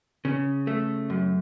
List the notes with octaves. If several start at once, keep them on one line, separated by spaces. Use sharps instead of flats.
C#3
A3
F#2